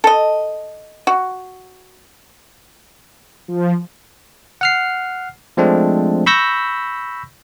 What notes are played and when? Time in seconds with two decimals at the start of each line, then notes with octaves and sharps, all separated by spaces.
0.04 A4 D#5
1.07 F#4
3.48 F3
4.61 F#5 F6 C7
5.57 F3 G#3 A3 C4 D4
6.26 B5 C#6 E6 G6 A#6 B6